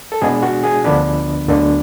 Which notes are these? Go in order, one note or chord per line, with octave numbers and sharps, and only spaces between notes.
A4
B2 G#3 B3 D4 G#4
F#4
G#4
D2 D3 F3 B3 D4 B4
D2 D3 F#3 B3 D4